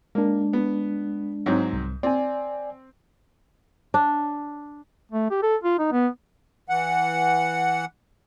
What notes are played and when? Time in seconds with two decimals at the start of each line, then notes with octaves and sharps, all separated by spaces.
0.15 G#3 A#3 D4
0.53 B3
1.46 G#2 F#3 C4
1.73 C2
2.03 C4 D5 G#5
3.94 D4
5.12 A3
5.31 G4
5.42 A4
5.64 F4
5.79 D#4
5.92 B3
6.69 E3 F#5